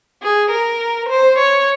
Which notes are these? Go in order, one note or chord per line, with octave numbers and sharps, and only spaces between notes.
G#4
A#4
C5
C#5